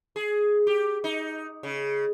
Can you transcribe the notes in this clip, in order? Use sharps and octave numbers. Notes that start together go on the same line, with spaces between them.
G#4
G4
D#4
C#3